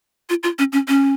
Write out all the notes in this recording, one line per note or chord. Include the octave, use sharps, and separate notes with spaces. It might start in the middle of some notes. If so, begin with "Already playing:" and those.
F4
F4
C#4
C#4
C#4